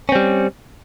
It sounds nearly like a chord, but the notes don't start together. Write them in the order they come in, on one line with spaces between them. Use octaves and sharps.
C#4 C4 G3